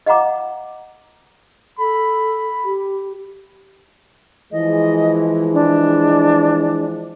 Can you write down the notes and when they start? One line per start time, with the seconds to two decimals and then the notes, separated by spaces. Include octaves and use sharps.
0.06 D#5 F5 F#5 A#5 D6
1.79 A4 B5
2.64 G4
4.52 E3 F3 G#3 D#5
5.53 D4